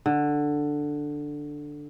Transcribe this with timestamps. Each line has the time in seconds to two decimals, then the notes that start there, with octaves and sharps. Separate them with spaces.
0.06 D3